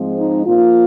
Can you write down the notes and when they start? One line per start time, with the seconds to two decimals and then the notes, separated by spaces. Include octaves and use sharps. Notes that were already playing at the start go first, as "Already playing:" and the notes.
Already playing: G#2 F3 G#3 C4
0.17 D#4
0.45 A#2 F3 A#3 F4